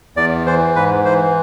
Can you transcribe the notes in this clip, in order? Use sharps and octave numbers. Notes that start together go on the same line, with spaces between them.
E2 D5
E3 C5
G#2 B4
E3 C5